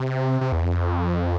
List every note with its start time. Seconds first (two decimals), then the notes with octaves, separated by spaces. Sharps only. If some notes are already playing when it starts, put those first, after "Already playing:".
Already playing: C3
0.41 C3
0.52 E2
0.63 F2